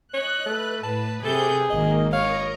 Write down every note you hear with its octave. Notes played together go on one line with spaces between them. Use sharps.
C#5 D#5 F#6
A3 B4
A2 A5
C3 G#4 A4 G6
G#1 D#3 A#3 D#5
A#4 C#5 D#5 F5 A#5